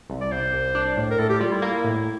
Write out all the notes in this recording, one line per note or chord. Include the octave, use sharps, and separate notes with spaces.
C2
D5
C2 C5
C2
D4
A2
A#4
A2 A4
G4
G3 F4
E4
A#3
A2